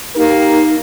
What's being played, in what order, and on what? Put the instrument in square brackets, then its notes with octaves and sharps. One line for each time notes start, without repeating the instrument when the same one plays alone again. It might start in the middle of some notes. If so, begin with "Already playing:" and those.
[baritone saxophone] A#3 [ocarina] D#4 [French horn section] G4 A#4